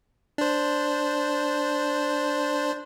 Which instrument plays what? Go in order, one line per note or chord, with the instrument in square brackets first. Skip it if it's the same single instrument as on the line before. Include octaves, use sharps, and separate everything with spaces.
[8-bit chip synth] D4 C5